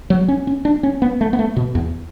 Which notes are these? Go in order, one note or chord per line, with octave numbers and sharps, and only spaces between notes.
F#3
C#4
C#4
D4
C#4
B3
A3
B3
A3
B2
E2